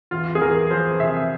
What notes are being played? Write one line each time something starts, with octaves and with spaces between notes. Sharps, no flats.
E2 F4
G#4
E2 A#4
F3 C5
C3 E5